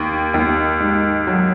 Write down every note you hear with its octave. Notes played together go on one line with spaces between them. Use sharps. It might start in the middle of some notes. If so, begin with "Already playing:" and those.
Already playing: D#2
D#2
G#2
F#3